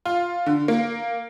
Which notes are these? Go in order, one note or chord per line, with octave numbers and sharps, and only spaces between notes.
F4
D3
A#3